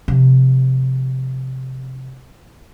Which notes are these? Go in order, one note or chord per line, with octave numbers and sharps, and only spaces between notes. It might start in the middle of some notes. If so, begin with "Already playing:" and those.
C3 F3